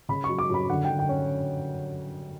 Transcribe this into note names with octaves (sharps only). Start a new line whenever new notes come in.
C#3 B5
C#6
F#3
D6
F#2 B5
D3 F#5
D3 G5
G5
C#4